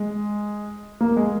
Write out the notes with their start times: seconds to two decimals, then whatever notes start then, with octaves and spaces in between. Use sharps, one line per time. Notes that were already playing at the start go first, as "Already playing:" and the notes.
Already playing: G#3
1.01 A#3
1.17 G#3